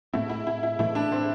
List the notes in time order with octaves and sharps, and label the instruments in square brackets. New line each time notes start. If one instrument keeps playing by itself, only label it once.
[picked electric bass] A2 A3 C4 [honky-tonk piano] E4
[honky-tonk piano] E4
E4
E4
[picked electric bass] A2 E3 A3 [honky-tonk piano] E4
[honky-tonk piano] D4
C4